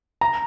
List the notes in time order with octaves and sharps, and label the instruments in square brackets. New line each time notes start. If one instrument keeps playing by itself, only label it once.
[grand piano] A#5